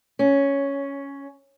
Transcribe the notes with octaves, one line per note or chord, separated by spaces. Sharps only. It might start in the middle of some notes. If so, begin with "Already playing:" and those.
C#4